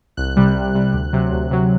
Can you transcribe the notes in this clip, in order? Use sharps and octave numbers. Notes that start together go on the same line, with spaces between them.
C2 F#6
C3 G3
C2
C3 G3
D2
C3 F#3
D2
C3 F#3